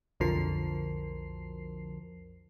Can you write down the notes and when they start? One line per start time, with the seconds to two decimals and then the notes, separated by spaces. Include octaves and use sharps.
0.20 B1 F2 D3 F3 A#4 C7